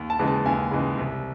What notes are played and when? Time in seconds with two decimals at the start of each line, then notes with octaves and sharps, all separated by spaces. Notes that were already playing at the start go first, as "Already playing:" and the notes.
Already playing: D#2
0.10 A5
0.19 C#3 E3 G#3
0.27 A5
0.45 D#2 G#5
0.71 C#3 E3 G#3
0.98 C2